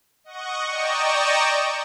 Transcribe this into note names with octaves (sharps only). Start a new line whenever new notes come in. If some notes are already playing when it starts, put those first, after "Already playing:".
D#5 F#5 C#6
D5 D#5 G5 A#5 C#6 E7